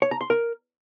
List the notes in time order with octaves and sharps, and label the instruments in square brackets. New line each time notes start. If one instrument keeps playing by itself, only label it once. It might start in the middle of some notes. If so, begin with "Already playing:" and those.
[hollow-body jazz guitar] C#5
A#5
C6
A#4